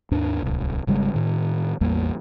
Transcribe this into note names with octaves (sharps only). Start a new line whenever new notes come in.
D#2 G#2 D4
D1 C2
G#1 C#3 G3 G#3
A2 D#3
A1 E2 G3 A#3